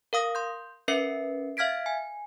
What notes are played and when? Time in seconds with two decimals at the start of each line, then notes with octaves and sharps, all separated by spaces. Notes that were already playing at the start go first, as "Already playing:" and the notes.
0.13 A#4 F5 D#6 A#6
0.35 C6 G6
0.88 C#4 A#4 B4 E5 C7 C#7
1.57 E5 F5 F6 G#6 B6 D7
1.86 G#5